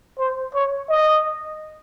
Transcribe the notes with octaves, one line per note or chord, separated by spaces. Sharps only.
C5
C#5
D#5